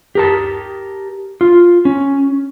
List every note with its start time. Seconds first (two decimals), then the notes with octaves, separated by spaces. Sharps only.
0.15 G4 A#4 A5
1.41 F4
1.85 C#4